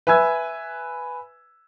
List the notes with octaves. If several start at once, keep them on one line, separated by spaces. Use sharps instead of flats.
B4 E5 G#5 E6 G#6